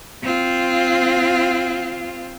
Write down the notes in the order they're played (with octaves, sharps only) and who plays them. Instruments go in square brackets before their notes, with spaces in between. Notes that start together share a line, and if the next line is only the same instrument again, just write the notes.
[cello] C4 F4